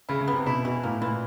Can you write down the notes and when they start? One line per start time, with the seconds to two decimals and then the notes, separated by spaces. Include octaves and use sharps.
0.09 C#3 E4
0.21 C#3
0.28 B3
0.33 C3
0.46 B2 E4
0.65 B2 E3
0.83 A2 A#3
1.01 A#2 E3